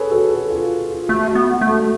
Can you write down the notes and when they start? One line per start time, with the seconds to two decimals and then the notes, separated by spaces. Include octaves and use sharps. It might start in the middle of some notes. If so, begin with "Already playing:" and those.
Already playing: G#4 A4 B4 C#5
0.11 F#4 A4
0.30 F#4 A4
0.50 F4 G#4
0.90 F4
1.09 A3 F#4
1.28 F#4
1.35 B3
1.48 F#4
1.61 A3
1.67 F#4 A4